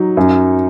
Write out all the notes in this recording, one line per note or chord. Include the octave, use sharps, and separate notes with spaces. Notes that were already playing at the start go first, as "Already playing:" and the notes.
Already playing: F#3 D#4
F#2